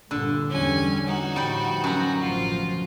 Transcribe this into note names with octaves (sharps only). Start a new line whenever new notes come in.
G1 A#2 D3
E2 E3 G3 C#4 G#5
D#4 F#4
A2 F3 G3 G5
F#2 A#5
A1 B2 F3 F4